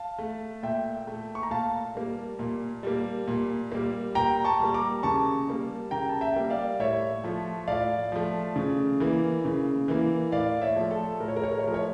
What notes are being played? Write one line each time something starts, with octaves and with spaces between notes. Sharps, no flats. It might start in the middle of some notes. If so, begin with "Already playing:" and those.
Already playing: F5 A5
A3
A#2 E5 G5
A3
C#6
A#5
A#2 F5 A5
G3 A#3
A#2
G3 A#3
A#2
G3 A#3
A#2 G5 A#5
A5 C#6
G3 A#3
A#5 D6
C#3 A5 C#6
G3 A#3
C#3 G5 A#5
A5
E5 G5
G3 A#3
D5 F5
A2 C#5 E5
F3 A3
A2 D5 F5
F3 A3
C#3
E3 A#3
C#3
E3 A#3
A2 D5 F5
C#5 E5
F3 A3
A4
A2 A#4
C#5
A#4
C#5
A#4
C#5
F3 A3 A#4
C#5